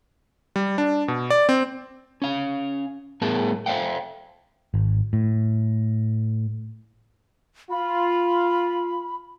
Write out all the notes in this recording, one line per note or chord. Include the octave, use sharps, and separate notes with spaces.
G3
D4
B2
D5
C4
C#4 F5
A2 G3 B3 G#4 A#4 A5
A4 C5 E5 F5 G5
G#1
A2
F4 B5